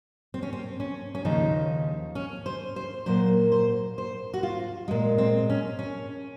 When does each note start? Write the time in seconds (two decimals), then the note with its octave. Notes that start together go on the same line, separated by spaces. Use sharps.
0.34 C4
0.43 C#4
0.53 C4
0.80 C#4
1.15 C#4
1.25 D#2 C#3 F3 D#4
2.15 C#4
2.46 C5
2.76 C5
3.06 A#2 F#3 A#3 C5
3.52 C5
3.98 C5
4.34 F#4
4.43 F4
4.88 A#2 G#3
5.18 C4
5.50 C#4
5.79 C#4